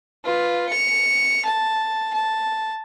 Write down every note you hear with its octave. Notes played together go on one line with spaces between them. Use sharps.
F4 B4
C#7 F7
A5
A5